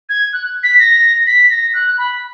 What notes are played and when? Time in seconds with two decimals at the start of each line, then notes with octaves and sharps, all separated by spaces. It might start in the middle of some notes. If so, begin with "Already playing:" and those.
0.09 G#6
0.33 F#6
0.63 B6
0.79 A#6
1.27 B6
1.50 A#6
1.74 F#6
1.98 B5